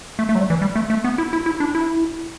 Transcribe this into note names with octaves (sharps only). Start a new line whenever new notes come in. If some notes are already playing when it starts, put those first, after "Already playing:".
A3
A3
F#3
G3
E3
G3
A3
A3
B3
E4
E4
E4
D4
E4